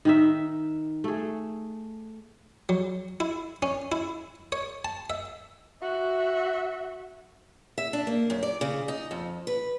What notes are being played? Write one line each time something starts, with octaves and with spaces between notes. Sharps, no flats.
D#3 D#4 E5
A3 G#4
F#3
E4
C#4
E4
C#5
A5
E5
F#4 E5
E5
D4
A#3
F#2
D5
C#3
D#4
F2
B4